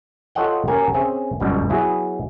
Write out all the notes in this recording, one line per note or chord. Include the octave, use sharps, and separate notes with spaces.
F4 A4 C#5 D#5 F#5 G5
A#3 C#4 G4 A#4 G#5
C4 C#4 G#4 E5
G1 C#2 F#2 B2 G3
F#3 B3 E4 F#4 G#4